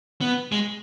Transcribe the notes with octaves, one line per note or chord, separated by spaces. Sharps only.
B3
G#3